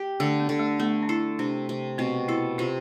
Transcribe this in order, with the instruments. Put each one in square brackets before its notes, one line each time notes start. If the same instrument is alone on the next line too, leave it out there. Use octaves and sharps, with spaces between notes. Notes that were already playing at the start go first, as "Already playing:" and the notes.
Already playing: [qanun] G4
[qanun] D3 [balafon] A3
[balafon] B3
[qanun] D3
[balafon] A3
[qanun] A3 [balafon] B3
[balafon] D4
[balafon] E4 [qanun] A4
[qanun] C3 [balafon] D4
[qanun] C3
[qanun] B2 [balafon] C4
[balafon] E4 [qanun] A4
[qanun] C3 [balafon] F4